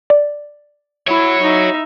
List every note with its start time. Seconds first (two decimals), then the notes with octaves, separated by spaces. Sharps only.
0.10 D5
1.08 E4 F#4 C#5
1.43 D#4 E5